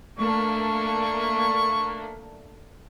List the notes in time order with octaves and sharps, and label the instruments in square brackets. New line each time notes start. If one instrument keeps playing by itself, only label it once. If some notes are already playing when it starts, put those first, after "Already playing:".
[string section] A3 A#3 D4 [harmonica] C#6